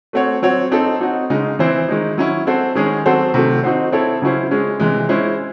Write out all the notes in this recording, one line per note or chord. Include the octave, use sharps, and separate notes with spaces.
A3 C4 F#4 C#5
F#3 C4 F#4 C#5
C4 D#4 A4
C4 D#4 F#4
C#3 G#3 D#4
E3 C4 E4 C5
D#3 G#3 D#4
F#3 C#4 E4
C4 F#4 A4 C5
D#3 G#3 C#4 G#4
F#3 C4 F#4 A4 C5
C3 D#3 F#3 A3
C4 D#4 F#4 C5
C4 E4 A4 C#5
C#3 F#3 C#4 E4 C5
G#3 C#4 G#4
C3 E3 G#3
G#3 C#4 E4 C5